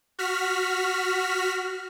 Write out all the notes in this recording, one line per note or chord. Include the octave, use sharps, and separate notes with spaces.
F#4 F6 B6